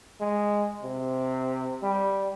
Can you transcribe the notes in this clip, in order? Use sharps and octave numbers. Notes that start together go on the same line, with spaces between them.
G#3
C3
G3